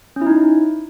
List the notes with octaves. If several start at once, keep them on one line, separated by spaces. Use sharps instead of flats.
C#4
E4
D#4